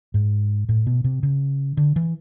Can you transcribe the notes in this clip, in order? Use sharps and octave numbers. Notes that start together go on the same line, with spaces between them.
G#2
A2
B2
C3
C#3
D3
E3